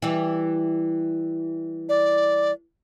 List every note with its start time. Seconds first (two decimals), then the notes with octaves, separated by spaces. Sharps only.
0.02 E3 G3
1.89 D5